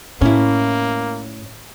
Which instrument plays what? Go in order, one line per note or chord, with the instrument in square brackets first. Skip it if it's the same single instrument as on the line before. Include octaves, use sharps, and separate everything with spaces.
[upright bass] A2 [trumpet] A#3 [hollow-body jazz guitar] C#4 E4